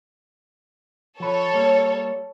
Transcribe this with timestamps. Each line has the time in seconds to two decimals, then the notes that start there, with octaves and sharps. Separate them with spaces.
1.20 F3 A4 B4 C#5
1.53 G3 A#3